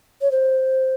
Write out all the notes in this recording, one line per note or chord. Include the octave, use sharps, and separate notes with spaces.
C#5
C5